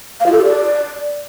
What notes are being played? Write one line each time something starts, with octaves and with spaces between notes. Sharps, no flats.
F5
F4
A4
G4
D5